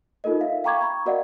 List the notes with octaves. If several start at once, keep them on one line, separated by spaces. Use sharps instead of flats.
D#4 F4 A4 A#4 D#5
E5 F5
F5 G5 A#5 C#6 D6 G#6
A#5 B5 C#6
F#4 A#4 D5 D#5 F5 F#5